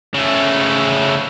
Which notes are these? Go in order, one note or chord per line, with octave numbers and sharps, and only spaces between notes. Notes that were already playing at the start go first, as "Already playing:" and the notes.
C#3 A3